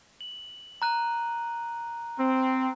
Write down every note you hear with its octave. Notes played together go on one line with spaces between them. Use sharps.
F#7
A#5 F#6 D#7
C4